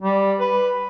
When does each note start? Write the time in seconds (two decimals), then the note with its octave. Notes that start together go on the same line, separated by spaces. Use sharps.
0.02 G3
0.39 B4